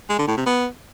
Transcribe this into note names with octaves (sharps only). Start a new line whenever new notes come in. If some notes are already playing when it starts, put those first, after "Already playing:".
G#3
D3
A2
C3
B3